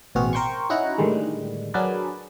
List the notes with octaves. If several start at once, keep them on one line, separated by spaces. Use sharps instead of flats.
A1 B2 C4 F#4 G#4 F6
A#4 C5 G5 C6 C#6
C#4 D#4 E4 F#4 F#5 A#5
A2 D3 D#3 G3 G#3
F#3 D4 G#4 A#4 B4 D5